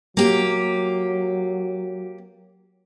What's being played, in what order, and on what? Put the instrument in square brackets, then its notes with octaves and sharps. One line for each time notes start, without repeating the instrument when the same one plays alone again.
[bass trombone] F#3 [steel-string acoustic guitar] A#3 G4